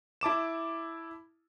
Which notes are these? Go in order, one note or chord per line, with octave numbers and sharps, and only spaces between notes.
E4 A5 D6 E7